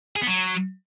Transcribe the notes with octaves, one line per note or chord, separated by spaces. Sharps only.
G#4
B3
F#3